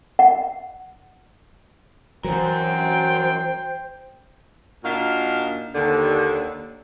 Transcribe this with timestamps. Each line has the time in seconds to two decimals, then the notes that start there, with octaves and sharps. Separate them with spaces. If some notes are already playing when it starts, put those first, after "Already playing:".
0.19 F#5
2.25 E3 F#3 F#4 A#4 C5 G5
4.84 A#2 D4 D#4 F#4 F5
5.74 D#2 D3